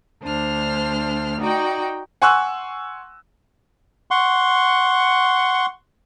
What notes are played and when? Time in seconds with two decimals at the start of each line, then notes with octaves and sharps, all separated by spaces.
0.23 D2 D4 C5 F6
1.40 D#4 F#4 D5 G5
2.22 F#5 G#5 C6 C#6 E6 F#6
4.11 F#5 C6 C#6